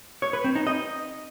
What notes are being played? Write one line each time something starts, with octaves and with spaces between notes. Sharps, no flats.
C#5
B4
C4
D#4
D#5